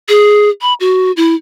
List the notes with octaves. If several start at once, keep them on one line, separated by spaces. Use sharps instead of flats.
G#4
B5
F#4
E4